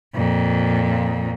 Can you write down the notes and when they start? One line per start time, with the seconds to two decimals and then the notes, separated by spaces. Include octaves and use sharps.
0.15 F2 A#2